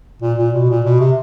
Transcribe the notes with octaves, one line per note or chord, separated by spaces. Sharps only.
A#2
A#2
B2
A#2
B2
C3